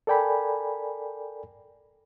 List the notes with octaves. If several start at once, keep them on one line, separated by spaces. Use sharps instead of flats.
A4 A#4 D5 G5 G#5 B5